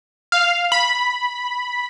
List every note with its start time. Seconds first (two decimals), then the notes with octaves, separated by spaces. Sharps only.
0.32 F5
0.72 B5